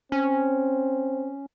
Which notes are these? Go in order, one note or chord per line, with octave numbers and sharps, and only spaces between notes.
C4 C#4